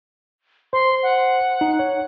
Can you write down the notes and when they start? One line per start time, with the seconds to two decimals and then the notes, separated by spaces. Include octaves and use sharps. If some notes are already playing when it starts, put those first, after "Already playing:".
0.73 C5 C6
1.03 F#5
1.61 D#4
1.79 C#5